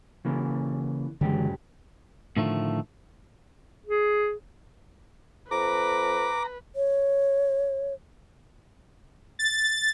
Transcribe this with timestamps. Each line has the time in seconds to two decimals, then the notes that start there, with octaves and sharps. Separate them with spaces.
0.25 C#3 E3 A#3
1.21 C#2 F#2 D3 E3 G#3 G4
2.37 A2 D3 D#3 F3 A3
3.86 G#4
5.51 F2 B4 A#5 D6
6.76 C#5
9.39 A6